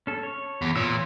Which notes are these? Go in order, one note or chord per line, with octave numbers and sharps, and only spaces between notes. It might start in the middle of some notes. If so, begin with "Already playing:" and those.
C#4 A4
C#5
E2
A#2 E3 C#5 E6